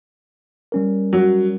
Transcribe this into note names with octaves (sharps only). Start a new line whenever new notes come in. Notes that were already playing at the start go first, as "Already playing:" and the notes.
G3 C#4 A#4
F#3